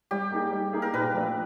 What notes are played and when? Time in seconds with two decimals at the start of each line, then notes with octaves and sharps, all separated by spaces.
0.11 G3 G4
0.32 A#3 D#4 G#4
0.52 G3
0.73 A#3 D#4 G#4
0.82 A#4
0.94 A#2 B4
1.14 F3 A3 D4